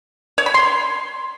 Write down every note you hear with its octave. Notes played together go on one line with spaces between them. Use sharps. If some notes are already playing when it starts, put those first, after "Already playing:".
C#5
B5
C6